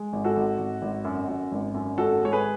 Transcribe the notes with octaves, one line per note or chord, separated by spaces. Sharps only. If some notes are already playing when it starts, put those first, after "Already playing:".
Already playing: G#3
G#1
F#4 A4
G#1
G#1
G#1
F#2
F#2
G#1
F#2
G#1 F#4 A4
G#3 C#5
G#4 B4